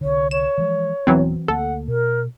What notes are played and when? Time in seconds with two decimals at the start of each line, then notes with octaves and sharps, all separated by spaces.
0.01 C2 D3 C#5
0.31 C#5 E7
0.58 E3 F3 G#3
1.07 D#1 E3 F#3 B3 C4
1.48 D2 A#3 A4 F#5
1.88 B2 A#4